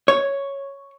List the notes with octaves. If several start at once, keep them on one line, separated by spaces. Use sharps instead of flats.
C#5